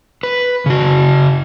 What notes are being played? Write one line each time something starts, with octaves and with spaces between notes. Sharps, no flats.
B4
C#3 F#4